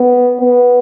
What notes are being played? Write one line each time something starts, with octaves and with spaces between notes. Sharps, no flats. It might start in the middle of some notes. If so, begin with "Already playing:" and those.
Already playing: B3
B3